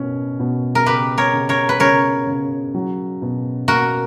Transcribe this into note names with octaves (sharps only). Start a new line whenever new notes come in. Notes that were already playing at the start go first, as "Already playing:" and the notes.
Already playing: B2 C#4
B2
A#4
C#3 G4 B4
A#4 C#5
C#3
A#4 C#5
B4
C#3 A#4 C#5
C#3
F#3
B2
A#3 F#4 A#4